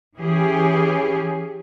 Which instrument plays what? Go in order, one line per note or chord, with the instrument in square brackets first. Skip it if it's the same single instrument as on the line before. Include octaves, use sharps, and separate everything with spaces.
[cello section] E3 C#4 G4 G#4